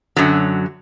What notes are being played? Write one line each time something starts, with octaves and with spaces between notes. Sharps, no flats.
F#2 D3 F#3